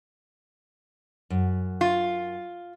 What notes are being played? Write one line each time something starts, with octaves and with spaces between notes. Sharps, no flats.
F#2
F4